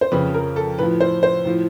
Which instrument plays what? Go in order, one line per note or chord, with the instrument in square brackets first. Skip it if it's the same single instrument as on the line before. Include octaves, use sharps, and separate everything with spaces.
[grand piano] C5
F2 C#3 F3 B4
A#4
A4
A2 F3 B4
C5
C5
A2 F3